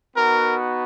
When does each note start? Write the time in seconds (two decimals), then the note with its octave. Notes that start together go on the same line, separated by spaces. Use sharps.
0.15 B3 D#4 F#4 A#4